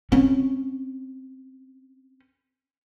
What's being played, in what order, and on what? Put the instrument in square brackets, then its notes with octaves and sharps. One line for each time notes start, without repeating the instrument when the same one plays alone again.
[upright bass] C4 C#4